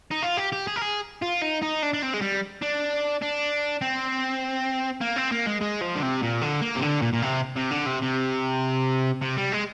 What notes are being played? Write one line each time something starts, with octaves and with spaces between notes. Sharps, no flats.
D#4
F4
G4
G4
G#4
A#4
G#4
F4
D#4
D#4
D4
D4
C4
G#3
G3
D4
D4
C4
A#3
C4
A#3
G#3
G#3
F3
D3
C3
A#2
D3
A#3
C3
D3
A#2
A#2
C3
C3
D3
C3
C3
C3
G3
G#3